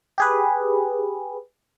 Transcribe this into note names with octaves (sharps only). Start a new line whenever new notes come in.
G4 G#4 B4